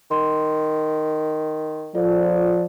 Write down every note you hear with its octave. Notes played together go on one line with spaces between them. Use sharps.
D#3 C6
F3 F4 A4 D5